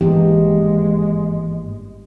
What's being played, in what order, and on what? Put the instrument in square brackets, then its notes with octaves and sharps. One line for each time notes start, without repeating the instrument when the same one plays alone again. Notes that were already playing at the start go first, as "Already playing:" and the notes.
[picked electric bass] G#1 G2 A#3 [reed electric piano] E3 [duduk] G#3 [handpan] B3 G4